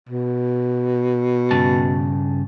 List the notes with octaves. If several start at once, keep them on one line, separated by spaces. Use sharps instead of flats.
B2
G2 C#3 A5